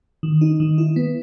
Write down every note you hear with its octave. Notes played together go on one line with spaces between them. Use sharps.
D#3
D#4
D#3
E4
B3